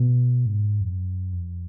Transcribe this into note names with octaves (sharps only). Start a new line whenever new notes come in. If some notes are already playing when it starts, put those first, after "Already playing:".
Already playing: B2
G#2
F2
F#2
F2